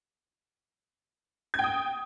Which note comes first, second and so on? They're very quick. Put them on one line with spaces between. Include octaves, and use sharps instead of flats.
G#6 G5 D#6